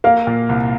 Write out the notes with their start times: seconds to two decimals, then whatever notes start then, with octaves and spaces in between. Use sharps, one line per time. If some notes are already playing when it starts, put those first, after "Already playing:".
0.04 A#3 F5
0.27 A#2
0.49 C2